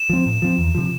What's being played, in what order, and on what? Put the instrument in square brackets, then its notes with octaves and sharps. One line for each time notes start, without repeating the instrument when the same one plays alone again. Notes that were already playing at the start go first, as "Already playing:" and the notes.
Already playing: [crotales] E7
[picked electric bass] F3 C4
A2
F3 C4
E2
C3 F3